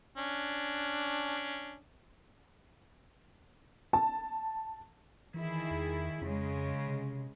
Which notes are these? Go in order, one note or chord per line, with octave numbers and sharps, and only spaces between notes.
C#4 D4
A5
D#3 E3 E4 G#4
E2
F2 C#3 G#3
C3